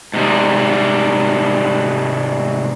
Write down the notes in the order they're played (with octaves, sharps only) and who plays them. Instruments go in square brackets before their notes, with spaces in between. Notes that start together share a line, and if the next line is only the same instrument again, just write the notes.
[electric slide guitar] G#2 C3 G3